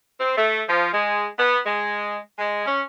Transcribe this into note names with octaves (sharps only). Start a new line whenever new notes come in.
C4
A3
F3
G#3
B3
G#3
G#3
C#4